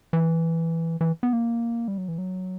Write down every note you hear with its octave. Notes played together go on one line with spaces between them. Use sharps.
E3
E3
B3
A#3
G3
F#3
E3
F#3